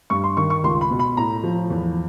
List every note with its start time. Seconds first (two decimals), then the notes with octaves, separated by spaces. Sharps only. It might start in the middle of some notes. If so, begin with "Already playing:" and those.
0.10 G2 C#6
0.24 C6
0.37 D#3 C#6
0.50 C#6
0.64 C#2 C6
0.81 B5
0.90 B2
0.99 B5
1.17 A2 A#5
1.44 F3
1.70 E2